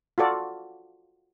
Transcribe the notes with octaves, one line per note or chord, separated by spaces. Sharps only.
F4 F#4 A4 D5